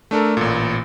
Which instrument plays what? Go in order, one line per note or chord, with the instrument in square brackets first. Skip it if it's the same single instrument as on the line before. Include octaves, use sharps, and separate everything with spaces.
[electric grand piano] A3 D4 A4 A#4
A1 A#2